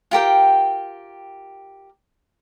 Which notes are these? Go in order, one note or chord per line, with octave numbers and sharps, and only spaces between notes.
F4 G4 A#4 G5